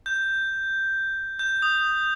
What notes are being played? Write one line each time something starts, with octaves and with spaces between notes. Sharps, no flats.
G6
G6
D#6